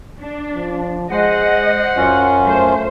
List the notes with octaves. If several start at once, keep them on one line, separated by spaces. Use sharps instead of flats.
D4
F3
G#3 C5 D#5 F#5
F#2 F#3 C#4 F4
A3 C5